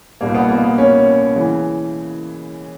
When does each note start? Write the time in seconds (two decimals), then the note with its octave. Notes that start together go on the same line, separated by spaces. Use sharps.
0.21 C2 B2 G3 A#3
0.34 B3
0.49 A#3
0.64 B3
0.78 C#4
1.35 C#3 E3